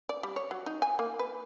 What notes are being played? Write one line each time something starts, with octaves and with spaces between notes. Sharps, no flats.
D5
G3
C#5
F#3
D#4
G#5
A#3
B4